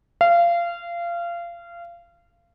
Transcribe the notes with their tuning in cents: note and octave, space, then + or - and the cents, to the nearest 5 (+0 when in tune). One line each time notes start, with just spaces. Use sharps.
F5 -25